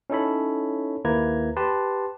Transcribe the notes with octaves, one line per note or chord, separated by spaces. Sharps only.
C#4 D#4 E4 A4 C#5 B5
D#2 A#3 E4 B4 A#5 G#6
G4 B4 A5 C6